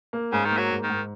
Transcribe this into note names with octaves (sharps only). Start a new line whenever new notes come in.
A#3
G#2 C#3
D#3
A#3
F#3
G#2
D#3
G#2